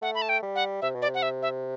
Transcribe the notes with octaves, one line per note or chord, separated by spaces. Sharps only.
A3 F#5
B5
A5
G5
G3
F#5
C3 E5
B2
D5
C3
F#5
E5
E5